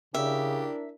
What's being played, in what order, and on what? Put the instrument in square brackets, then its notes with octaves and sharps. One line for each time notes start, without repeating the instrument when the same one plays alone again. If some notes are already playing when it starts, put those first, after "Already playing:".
[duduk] C#3 [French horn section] D4 E4 A#4 [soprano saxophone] G4 [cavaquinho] E5